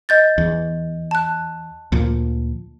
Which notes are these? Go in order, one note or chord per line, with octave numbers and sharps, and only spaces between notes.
D#5 G6 A6
E2
A5 F#6
D2 A#2 F3